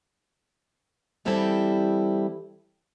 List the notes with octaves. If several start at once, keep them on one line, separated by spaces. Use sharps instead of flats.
E3 G3 C4 E4 G4 A4